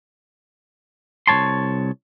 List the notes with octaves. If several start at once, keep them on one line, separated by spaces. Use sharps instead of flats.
C2 G#3 C#5 A5 C6